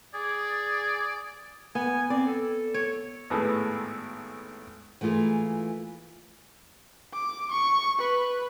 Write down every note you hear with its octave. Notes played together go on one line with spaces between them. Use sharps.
G#4 D5
B3 G#5
C4 D5
A4
C#5
G#1 A2 B3 G#4 A4
E3 A3 A#3 F4 G#4
D6
C#6
B4